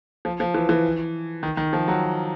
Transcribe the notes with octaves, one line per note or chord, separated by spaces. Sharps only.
F3
F3
E3
E3
D#3
D#3
F3
F#3